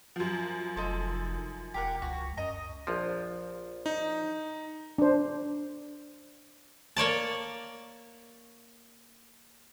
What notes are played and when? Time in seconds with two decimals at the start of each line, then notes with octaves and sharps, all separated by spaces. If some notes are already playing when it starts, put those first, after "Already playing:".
0.16 F#2 F3
0.76 F1 D#4 A4 C5
1.74 E1 G4 A#4 F#5
2.02 C#2 F#4
2.37 F#2 D#5 A#5
2.87 A#1 F3
3.86 D#4
4.98 D4 C5
6.97 A#3 C#5 D5 A5